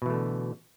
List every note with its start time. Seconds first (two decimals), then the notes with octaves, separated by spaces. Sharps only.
0.02 B2
0.06 E3
0.10 A3
0.14 D3